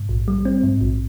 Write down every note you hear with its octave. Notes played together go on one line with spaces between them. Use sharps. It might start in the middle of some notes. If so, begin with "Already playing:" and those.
Already playing: G#2
A#1
G3
C4
G#2
A#1